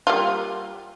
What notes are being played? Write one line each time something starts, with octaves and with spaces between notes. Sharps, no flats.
G3 A#3 F4